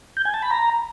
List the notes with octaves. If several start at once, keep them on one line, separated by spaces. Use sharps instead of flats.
G6
G#5
A5
B5
A#5